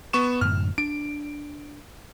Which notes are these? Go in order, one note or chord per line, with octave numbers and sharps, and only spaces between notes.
B3 C#6 E7
F#2 A2 D3 F6
D4 D7